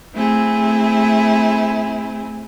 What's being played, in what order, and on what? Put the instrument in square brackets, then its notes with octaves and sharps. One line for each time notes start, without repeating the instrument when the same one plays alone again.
[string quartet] A3 C4 E4 G#4